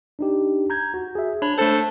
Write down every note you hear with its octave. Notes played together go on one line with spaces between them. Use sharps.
D4 D#4 G4
A#5 G6 G#6
F#4
G#4 E5
D4 C#5 A5 B5
A3 D4 A4 C5